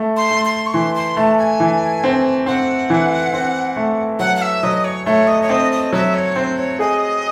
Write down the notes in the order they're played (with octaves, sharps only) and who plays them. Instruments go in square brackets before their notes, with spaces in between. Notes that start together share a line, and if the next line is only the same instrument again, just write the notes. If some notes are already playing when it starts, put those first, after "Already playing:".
Already playing: [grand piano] A3
[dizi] C6
[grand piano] A3
[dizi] C6
C#6
[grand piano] E3 [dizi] C6
[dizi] C6
[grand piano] A3 [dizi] A5
[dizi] G#5
[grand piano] E3
C4
[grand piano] C4 [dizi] F#5
[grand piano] E3
C4
A3
[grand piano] F#3 [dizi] F#5
[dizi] F#5
E5
[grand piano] F#3 [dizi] D#5
[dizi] C#5
[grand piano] A3 [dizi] C#5
[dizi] D#5
C#5
[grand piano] C4 [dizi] D#5
[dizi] D#5
[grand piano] F#3 [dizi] E5
[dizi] C#5
[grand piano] C4 [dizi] C5
[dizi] C#5
[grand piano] G#4 [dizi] D#5